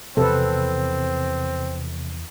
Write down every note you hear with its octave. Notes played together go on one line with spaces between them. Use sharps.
E2 C3 F3 C4 A4 B4